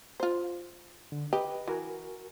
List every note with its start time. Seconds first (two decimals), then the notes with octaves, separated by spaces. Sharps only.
0.20 F4 C5
1.12 D3
1.33 G4 B4 D#5
1.68 E3 F#4 A#4 G#5